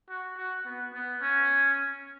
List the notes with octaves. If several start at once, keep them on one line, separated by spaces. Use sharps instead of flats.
F#4
F#4
B3
B3
C#4